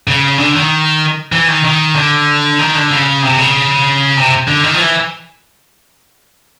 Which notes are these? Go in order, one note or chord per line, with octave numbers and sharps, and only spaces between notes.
C#3
D3
D#3
E3
D#3
D#3
D3
D#3
D3
C#3
C3
C#3
C3
D3
D#3
F3
E3